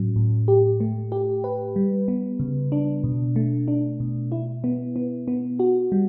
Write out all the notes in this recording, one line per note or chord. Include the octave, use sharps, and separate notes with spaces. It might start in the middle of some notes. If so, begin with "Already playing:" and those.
Already playing: A2 F#3 C#4
A2
G4
A3
G4
B4
G3
B3
C#3
D4
B2
A3
D4
B2
E4
B3
B3
B3
F#4
G3